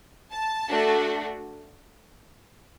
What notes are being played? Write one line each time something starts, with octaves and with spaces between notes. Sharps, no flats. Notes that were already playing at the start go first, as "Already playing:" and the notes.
A5
A3 D4 F#4